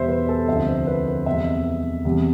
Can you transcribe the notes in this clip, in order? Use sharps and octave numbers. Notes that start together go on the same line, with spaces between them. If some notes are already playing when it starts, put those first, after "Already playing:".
Already playing: E2 B2 G3 C5 E5
B4
A4
D2 C3 F3 E5
C5
B4
C5
E2 C3 G3 E5
E2 C3 E3 G3